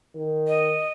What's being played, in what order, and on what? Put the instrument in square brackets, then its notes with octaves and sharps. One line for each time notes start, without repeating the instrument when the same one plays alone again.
[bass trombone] D#3
[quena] D#5